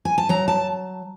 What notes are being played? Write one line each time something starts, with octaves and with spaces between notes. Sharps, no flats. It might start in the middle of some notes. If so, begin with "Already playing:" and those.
G#5
A5
F#3 A#5
A5